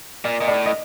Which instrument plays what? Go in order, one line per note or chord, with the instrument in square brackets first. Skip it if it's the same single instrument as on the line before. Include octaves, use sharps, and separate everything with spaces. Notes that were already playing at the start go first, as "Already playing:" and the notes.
[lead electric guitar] A#2 [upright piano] D5
[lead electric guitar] A#2 [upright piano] D#5
[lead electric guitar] A2 [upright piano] D5
[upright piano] D#5